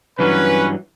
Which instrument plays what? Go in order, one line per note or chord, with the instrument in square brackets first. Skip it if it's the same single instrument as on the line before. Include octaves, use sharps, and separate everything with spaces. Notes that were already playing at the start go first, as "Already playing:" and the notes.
[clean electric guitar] G2 E3 F#3 [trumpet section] C#4 B4